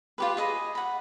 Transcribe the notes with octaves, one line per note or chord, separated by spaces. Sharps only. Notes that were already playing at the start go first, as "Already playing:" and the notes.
F4 G4 B4
G#4 D#5 B5
F#5 B5